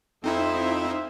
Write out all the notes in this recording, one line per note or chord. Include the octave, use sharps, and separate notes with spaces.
F2 C4 D#4 E4 C5 E5